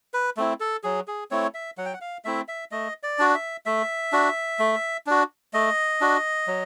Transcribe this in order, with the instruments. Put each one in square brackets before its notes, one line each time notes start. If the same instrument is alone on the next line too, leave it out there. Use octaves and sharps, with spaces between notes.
[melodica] B4
A3 C4 E4
A4
F#3 G#4
G#4
A3 C4 E4 C#5
E5
F#3 F#5
G5
F#5
F5
A3 C4 E4 E5
E5
A3 D#5
D5
D4 F#4
E5
A3 E5
D4 F#4
A3
D4 F#4
A3 D#5
D4 F#4
F#3